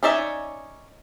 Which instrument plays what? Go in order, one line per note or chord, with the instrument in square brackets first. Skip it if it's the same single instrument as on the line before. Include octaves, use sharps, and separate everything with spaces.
[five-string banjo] C#4 D#4 D5 E5 G#5